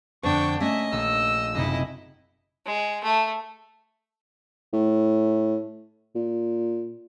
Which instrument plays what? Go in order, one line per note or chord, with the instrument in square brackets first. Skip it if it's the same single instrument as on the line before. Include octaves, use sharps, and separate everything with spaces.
[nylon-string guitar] F2 D3 [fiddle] D4 G5 [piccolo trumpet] C#6
[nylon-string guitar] A3 A#3 C#4 [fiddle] D#5 [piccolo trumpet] E5
[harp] A#1 [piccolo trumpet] E6
[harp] F#1 C3 D#4 [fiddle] E4 D#5
[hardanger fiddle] G#3
A3
[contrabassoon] A2
A#2